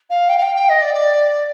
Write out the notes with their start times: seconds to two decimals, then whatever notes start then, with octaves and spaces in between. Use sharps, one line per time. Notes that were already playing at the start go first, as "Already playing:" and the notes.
0.10 F5
0.29 G5
0.37 F5
0.42 G5
0.55 G5
0.69 D#5
0.81 D5
0.94 D5